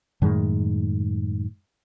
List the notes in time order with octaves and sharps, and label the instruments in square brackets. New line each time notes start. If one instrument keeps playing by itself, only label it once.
[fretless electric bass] F#2 A2 D#3 G#3